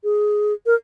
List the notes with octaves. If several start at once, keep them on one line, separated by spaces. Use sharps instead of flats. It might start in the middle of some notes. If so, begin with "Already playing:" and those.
G#4
A#4